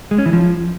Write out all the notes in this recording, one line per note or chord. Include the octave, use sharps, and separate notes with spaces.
G#3
C#4
E3
F3